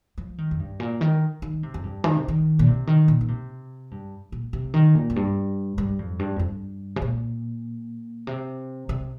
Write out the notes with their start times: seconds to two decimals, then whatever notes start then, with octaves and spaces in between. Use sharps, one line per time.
0.18 F3
0.38 D#3
0.51 F2
0.59 G2
0.80 A#2
1.01 D#3
1.42 D#3
1.63 C3
1.74 F2
1.83 G2
2.04 D#3
2.17 C3
2.28 D#3
2.59 A#2
2.67 C3
2.87 D#3
3.08 A#2
3.21 D#3
3.28 C3
3.91 G2
4.32 A#2
4.53 C3
4.74 D#3
4.95 A#2
5.10 F2
5.16 G2
5.78 G2
5.99 F2
6.19 G2
6.36 F2
6.39 G2
6.96 C3
7.02 A#2
8.27 C3
8.89 C3